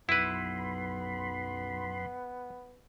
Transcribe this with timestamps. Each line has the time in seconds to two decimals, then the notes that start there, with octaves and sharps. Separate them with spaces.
0.09 B1 F#2 B3 E4 B4 B5 C6